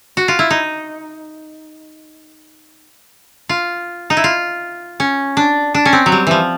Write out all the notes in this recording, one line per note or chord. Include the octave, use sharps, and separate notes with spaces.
F#4
F4
E4
D#4
F4
D#4
E4
F4
C#4
D4
D4
C#4
C4
F#3
G3
E3 F3